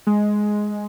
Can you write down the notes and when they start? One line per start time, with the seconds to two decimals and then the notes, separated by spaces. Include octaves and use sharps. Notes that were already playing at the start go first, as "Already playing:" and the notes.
0.07 G#3